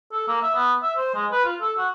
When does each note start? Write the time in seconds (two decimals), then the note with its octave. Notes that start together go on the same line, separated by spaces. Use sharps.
0.12 A4
0.28 A#3
0.42 E5
0.55 B3
0.83 E5
0.97 C5
1.15 G#3
1.32 B4
1.45 F4
1.61 A4
1.78 F#4